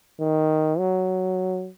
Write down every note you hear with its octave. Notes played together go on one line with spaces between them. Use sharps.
D#3
F#3